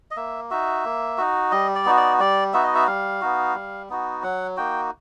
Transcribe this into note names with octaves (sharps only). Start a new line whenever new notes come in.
D#5
A#3 E5
D#4 F#4 E5
A#3
D#4 F#4
G3 D#5
D5
B3 D#4 F#4
D5
G3 D5
B3 D#4 F#4 E5
D#5
E5
G3 F5
B3 D#4 F#4
G3
B3 D#4 F#4
F#3 F#5
A#3 D#4 F#4 G5